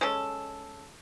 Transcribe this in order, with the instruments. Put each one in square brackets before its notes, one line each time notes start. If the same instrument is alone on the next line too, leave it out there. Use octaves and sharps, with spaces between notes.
[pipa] G#3 C#4 A4